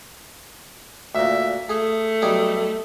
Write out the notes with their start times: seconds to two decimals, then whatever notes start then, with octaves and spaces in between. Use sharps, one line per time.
1.15 D2 A#2 E5
1.69 A3 G#4
2.22 B1 G3 G#4